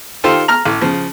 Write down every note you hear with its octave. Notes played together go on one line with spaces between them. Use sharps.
D#3 F4 G4 A4 C5
A#5 F6
A1
C#3 F3